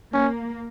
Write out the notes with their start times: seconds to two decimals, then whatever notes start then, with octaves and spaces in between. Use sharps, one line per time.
0.14 A#3 C#4